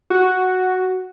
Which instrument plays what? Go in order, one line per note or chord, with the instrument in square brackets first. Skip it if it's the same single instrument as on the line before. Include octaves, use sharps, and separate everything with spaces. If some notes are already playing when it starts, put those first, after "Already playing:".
[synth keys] F#4